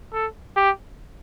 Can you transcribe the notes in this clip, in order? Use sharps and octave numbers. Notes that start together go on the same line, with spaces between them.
A4
G4